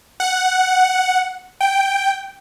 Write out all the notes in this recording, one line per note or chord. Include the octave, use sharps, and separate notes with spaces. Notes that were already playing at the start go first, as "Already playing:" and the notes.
F#5
G5